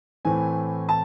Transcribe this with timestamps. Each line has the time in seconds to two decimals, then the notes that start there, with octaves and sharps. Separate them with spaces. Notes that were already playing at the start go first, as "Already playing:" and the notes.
0.25 A2 E3 A3 C4 G#5
0.89 A5